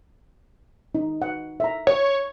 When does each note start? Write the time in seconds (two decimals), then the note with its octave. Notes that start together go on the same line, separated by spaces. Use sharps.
0.95 D#4
1.22 F#5
1.60 E5 A#5
1.87 C#5